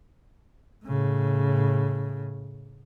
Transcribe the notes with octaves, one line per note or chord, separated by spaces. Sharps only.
A2 C#3